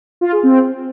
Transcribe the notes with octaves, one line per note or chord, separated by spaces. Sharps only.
F4
G#4
C4